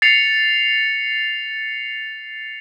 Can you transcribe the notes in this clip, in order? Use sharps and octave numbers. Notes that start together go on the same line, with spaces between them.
A6 C7 C#7 F7